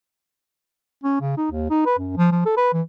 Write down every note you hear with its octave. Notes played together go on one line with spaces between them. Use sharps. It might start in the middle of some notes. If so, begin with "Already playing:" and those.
C#4
C#3
D#4
D#2
D#4
B4
F#2
F3
F3
A4
B4
E3